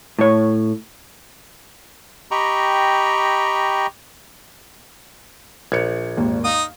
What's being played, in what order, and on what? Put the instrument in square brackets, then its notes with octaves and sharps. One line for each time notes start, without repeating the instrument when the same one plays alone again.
[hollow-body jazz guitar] A2 C#5
[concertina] G4 D#5 G5 A#5 B5 C#6
[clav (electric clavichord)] A#1 [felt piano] G#6 C#7
[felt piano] G#1 D#2 A#3
[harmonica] D#4 D#6 [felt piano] F5